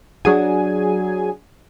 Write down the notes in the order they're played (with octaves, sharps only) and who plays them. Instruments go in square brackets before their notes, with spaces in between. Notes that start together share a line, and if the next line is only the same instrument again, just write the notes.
[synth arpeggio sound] F#3 G#4 G#5 [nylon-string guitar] D4 F#4